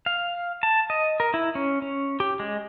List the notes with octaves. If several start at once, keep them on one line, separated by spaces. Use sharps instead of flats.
F5
A5
D#5
A#4
E4
C#4
C#4
G4
G#3